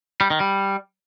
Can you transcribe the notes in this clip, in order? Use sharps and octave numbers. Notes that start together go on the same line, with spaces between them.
G3
D#3
G3